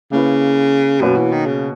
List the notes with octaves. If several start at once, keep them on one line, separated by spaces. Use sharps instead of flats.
C#3 A#3 E4 B4
F#2 B2 A#3 C#4 F#4 B4
E3
D#3
C#3